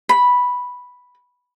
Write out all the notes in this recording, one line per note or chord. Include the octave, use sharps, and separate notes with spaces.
B5